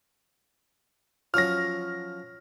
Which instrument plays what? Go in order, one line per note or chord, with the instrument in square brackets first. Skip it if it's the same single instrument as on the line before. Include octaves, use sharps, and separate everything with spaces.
[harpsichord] F3 F#3 C#4 [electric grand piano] F6 A#6